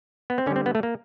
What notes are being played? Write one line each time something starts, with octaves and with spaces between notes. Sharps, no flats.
B3
C4
D3 G3 C#4
C4
B3
A3
A#3